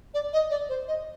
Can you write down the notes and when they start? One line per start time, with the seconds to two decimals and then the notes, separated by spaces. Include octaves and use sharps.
0.14 D5
0.33 D#5
0.50 D5
0.69 C5
0.88 D#5